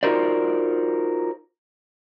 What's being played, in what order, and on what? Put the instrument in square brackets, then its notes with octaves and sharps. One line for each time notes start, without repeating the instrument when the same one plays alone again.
[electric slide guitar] D#4 F4 F#4 A#4 C5 D5